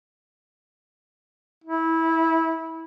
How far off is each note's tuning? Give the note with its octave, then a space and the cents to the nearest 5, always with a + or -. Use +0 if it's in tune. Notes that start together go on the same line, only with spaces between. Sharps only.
E4 -20